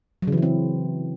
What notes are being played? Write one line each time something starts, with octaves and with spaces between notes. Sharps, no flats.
F#3
C#3
E3
E4
C4